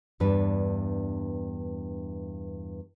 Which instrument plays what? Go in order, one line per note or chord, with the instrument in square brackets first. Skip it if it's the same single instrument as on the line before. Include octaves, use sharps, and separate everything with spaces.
[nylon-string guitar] E2 G2 D4 B4